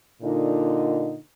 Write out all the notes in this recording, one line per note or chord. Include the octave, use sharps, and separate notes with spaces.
A#2 D3 D#4